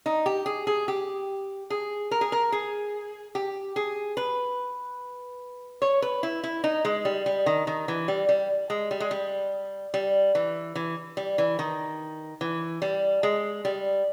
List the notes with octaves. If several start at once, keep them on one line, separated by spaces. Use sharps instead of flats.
D#4
G4
G#4
G#4
G4
G#4
A#4
G#4
A#4
G#4
G4
G#4
B4
C#5
B4
E4
E4
D#4
G#3
G3
G3
D#3
D#3
E3
G3
G3
G#3
G3
G#3
G3
G3
E3
E3
G3
E3
D#3
E3
G3
G#3
G3